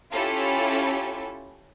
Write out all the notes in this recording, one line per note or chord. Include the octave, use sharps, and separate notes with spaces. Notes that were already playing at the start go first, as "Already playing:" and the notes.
C#4 E4 F4 G4 A4